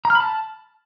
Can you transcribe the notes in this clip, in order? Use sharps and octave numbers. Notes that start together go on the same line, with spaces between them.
A#5
F6
B5
A5